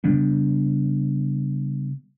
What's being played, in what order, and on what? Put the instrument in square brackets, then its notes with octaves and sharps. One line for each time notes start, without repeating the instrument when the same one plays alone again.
[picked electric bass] C#3 G3 B3 D4